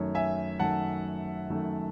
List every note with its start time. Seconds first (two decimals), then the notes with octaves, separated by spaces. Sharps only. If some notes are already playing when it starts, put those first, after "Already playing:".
Already playing: F#2 D#3 A3 C#5
0.15 E5 G#5
0.59 F#2 D#3 A3 F#5 A5
1.50 F#2 D#3 A3